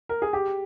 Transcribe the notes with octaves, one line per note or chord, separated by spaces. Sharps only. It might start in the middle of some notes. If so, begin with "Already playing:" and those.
A#4
G#4
G4